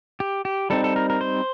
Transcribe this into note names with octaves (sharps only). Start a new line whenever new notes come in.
G4
G4
G3 C4 D#4 A4
A4
A#4
A#4
C5